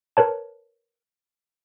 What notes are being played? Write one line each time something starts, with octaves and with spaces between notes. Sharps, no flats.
A#4 B4 C#5 A5